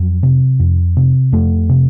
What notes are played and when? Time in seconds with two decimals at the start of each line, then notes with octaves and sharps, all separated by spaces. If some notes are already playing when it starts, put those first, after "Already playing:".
Already playing: F2 F#3
0.23 C3
0.60 F2
0.97 C3
1.32 F2 A3
1.69 C3